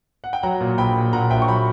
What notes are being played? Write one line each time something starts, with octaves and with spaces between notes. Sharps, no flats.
F#5
G5
F#3 F#5 A#5
A#2
A#1 G5 B5
A#2
A#2 F#5 A#5
A#1 E5 G5
C#6
F#3 G5 B5